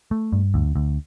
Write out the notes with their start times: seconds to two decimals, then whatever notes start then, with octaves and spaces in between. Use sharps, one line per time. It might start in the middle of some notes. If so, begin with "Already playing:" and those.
0.11 A3
0.33 G2
0.54 D2
0.76 D2